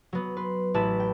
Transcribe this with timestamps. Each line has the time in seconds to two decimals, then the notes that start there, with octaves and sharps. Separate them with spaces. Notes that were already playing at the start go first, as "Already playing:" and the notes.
0.13 F#3 B3
0.37 B4 C6
0.74 A1 E4 B4 A5 E7
1.00 G5